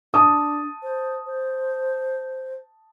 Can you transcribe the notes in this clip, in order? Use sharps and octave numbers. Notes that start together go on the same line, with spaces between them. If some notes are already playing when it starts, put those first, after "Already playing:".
D4 A5 D#6
C5
C5